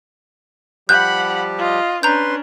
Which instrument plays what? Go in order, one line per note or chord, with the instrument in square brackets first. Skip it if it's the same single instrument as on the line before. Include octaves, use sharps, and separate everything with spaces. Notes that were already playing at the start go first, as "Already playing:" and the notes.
[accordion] F3 G3 G4 [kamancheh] F#5 B5 [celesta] F#6 [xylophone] G6
[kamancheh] F4 D#5
[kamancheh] C#4 D4 [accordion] B4 C6 [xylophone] A#5 G6